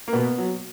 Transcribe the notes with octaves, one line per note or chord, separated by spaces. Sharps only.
A#3
B2 B3
F#3